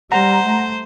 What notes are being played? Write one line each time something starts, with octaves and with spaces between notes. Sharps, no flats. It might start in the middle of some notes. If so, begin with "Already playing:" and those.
G3 C5 F#5 A#5
A3